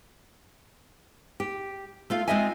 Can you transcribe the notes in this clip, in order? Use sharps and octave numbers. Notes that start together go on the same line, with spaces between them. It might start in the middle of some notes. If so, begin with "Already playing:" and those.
G4
A3 F4 F5
G#3 C4 F4 D#5 E5 G#5